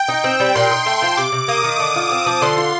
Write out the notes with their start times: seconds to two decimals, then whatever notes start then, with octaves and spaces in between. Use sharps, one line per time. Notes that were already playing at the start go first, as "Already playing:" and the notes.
Already playing: G5
0.09 D#4
0.24 C4
0.40 G3
0.55 A#2 C6
0.70 D#4
0.86 A3 C6
1.02 F3
1.17 C3 D6
1.32 C3
1.48 A#3 D#6
1.64 D#3
1.79 D3 D6
1.96 F4
2.11 C4
2.26 F3
2.42 D3 C6
2.57 F4